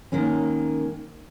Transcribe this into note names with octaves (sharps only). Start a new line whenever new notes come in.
D#3 G#3 A#3 C#4